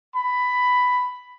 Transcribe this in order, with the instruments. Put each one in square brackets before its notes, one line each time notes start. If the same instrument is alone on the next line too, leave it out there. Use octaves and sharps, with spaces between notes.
[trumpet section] B5